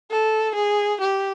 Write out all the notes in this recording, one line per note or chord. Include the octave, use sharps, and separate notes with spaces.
A4
G#4
G4